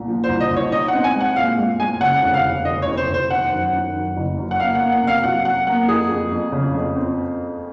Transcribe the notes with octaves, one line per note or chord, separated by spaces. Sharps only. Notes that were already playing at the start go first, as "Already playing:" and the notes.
Already playing: C2 A#2
F3
C2 C5
D#5
C2
C#5
D#4 D#5
F#5
C4
G#5
G#3
F#5
A#2 F5
G#3
G#3 G#5
C#3 F#5
F1 F#5
F5
F1
F1 D#5
C#5
F1
C5
F1
C5
D#3 F#5
F#2
D#3
F#2
F#1
F#2
F#5
A#3 F5
F#5
A#3
F#5
C3 F5
F#3 F#5
F#3 F#5
A#3 F#5
F2 G#4
F2
F2
C#3
F2
C4